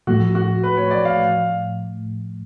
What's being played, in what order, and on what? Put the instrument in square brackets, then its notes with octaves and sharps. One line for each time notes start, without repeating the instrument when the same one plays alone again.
[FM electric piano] A2 F3 A3 [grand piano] F#4
[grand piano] F#4
B4
C#5
D5
F5